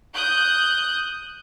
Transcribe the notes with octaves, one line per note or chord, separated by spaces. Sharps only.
D#6 F#6 G6